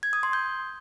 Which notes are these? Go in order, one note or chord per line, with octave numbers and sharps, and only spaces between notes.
G#6
D#6
C6
G6